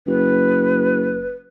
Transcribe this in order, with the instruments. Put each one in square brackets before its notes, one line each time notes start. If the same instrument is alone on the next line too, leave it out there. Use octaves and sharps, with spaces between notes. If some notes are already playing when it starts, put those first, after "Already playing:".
[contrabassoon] F#1 [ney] B4